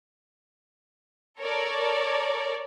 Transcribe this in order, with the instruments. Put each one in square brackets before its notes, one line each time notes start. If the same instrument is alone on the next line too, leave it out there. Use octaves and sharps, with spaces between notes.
[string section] A4 A#4 C#5 D5